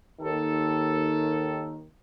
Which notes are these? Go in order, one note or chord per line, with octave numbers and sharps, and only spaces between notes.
D#2 D#3 A4